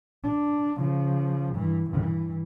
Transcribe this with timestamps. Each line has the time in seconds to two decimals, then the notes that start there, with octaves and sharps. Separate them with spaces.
0.24 D4
0.78 C#3 F3
1.55 G2 E3
1.90 G2 E3